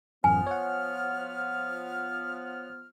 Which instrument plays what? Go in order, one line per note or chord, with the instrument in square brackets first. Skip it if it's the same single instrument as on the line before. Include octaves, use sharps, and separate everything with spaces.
[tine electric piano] A1 F#2 [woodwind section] F3 B3 F6 [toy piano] G#5
[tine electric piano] C#5 F#5